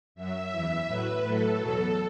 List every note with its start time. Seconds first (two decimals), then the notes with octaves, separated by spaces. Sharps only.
0.15 F#2 F#3 E5
0.51 E2 E3
0.86 A2 F#3 B4
1.22 A2 F#3 A4
1.58 E2 B2 F#3 A4